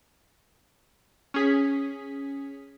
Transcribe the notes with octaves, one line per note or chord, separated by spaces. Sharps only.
C#4 G#4 B6